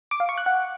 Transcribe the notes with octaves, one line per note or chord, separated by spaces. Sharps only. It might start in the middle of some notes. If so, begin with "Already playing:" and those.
D6
F5
C#6
F#6
F#5